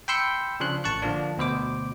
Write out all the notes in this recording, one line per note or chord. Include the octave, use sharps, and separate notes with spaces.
G5 B5 C6 E6 G6 C#7
C#3 F3 D4 C6 F#6
A1 A5 C#6 F#6
D3 F3 A#3 D4
D2 B2 C5 D6